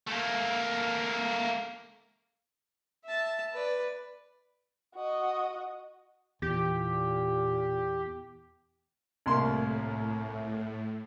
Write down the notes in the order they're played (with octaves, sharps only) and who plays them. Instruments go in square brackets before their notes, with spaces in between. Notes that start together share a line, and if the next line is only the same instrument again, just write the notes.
[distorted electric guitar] A3 A#3
[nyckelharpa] E5 A5
B4 D5
[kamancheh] F#4 D#5
[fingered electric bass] E2 [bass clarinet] A#2 [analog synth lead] G4
[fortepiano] C2 A#3 C6 [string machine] A2